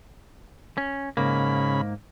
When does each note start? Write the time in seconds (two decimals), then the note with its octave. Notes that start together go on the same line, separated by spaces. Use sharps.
0.78 C#4
1.17 G#2 C#3 A#3 B5